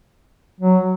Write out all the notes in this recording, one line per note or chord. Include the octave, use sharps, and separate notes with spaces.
F#3